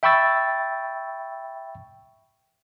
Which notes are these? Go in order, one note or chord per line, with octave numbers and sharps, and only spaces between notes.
E5 G5 B5 C#6 E6 A6